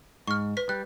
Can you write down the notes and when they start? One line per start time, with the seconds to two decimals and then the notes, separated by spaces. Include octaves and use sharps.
0.28 G#2 C#6 F6
0.57 B4 B6
0.69 G3 F#6